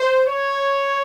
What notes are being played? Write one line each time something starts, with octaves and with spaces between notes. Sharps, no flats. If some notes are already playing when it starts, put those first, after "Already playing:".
Already playing: C5
C#5